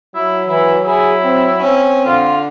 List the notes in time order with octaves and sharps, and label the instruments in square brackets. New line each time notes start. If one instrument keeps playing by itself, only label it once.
[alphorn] F#3 [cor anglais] E4
[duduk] E3 [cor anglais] E4
[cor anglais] E4 [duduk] G#4
[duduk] C4
[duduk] C4 [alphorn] C#4
[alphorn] D3 [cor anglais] F4